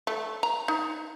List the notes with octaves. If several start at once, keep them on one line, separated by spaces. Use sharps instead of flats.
A3
A#5
D#4